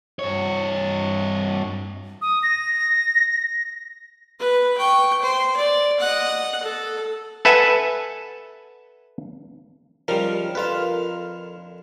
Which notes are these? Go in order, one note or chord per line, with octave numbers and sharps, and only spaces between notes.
G2 C#5
D#6
A#6
B4
G5 C#6
C5
D5
D#5 F#5
A4
A4 B4 E5 F#5 G#5 A5
C#3 F3 G3 D#4 A#4 F6
F2 D3 F4 B4 F5